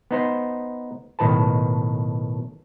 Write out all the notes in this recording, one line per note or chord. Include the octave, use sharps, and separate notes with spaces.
B3 D#4 C5
B1 A2 D#3 B4 A5